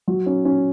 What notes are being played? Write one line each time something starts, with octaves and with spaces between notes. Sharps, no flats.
F#3
C#4
C#4